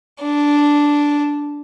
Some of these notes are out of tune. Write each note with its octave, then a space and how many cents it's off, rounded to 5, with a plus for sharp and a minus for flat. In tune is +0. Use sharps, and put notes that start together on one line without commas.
D4 -5